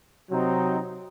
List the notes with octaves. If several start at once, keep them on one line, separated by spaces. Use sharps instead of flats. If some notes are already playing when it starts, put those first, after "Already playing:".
C3 F#3 C4 D#4